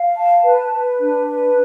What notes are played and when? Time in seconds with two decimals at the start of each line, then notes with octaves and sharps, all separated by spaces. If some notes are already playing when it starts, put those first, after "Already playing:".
Already playing: F5
0.14 A5
0.44 B4
0.72 B4
1.00 D4
1.28 B4